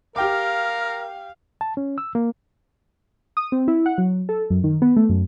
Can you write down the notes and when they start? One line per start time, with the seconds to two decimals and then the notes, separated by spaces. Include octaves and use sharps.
0.16 G4 A#4 F5 G5 D6
1.61 A5
1.77 C#4
1.98 E6
2.15 A#3
3.37 D#6
3.52 C4
3.68 E4
3.86 F#5
3.98 F#3
4.29 A4
4.50 F#2
4.64 D#3
4.82 B3
4.97 A3
5.09 F#2